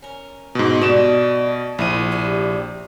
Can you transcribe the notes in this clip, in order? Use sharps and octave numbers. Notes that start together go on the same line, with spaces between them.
C#4 A#4
G#2 B2
B2 G3 A3 D5 E7
A#1 C3 C4 E4 A#4 D#7
C3 D4 G4